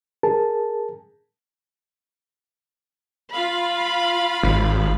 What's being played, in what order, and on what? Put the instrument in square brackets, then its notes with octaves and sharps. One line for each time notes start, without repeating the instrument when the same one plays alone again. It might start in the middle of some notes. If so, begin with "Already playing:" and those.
[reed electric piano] G#4 A#4 A5
[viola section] F4 F5 B5
[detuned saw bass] G#1